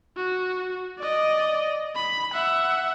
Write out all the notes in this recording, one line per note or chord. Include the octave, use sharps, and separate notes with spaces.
F#4
D5 D#5
B5
E5 F#5